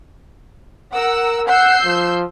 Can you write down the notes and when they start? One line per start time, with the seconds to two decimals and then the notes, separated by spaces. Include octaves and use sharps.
0.92 A#4 F#5 E6
1.49 F#5 E6 G6 C7
1.85 F3